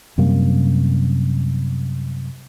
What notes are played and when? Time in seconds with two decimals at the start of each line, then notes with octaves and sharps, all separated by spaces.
0.18 F#2 C3 G3 A#3